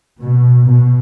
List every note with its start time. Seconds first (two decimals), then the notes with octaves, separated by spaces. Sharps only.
0.20 B2
0.67 B2